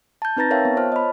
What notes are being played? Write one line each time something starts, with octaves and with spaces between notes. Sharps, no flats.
A5 G6
C4 D#4 B4 A#5 A6 A#6
A#4 C#5 E5 F5 G5 A5
B3
F4 C5 C#5 A5 F6
D#5 B5